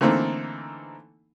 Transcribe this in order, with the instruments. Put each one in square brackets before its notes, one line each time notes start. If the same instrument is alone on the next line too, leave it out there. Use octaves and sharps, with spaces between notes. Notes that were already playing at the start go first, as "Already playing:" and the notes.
[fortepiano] D3 E3 A3 A#3 C4 D#4